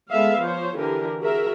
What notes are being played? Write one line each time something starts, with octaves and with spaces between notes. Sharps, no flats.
G#3 B3 A4 E5 F5
F3 C5 C#5
D3 E3 G4 A#4
F#4 G#4 A#4 E5